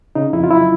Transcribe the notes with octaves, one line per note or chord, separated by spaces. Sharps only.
C#3 D#4
F2 E4
F4
F#3 E4